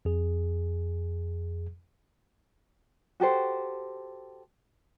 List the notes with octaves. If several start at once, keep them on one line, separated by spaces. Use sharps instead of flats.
F2 G#4
F#4 G4 A4 C5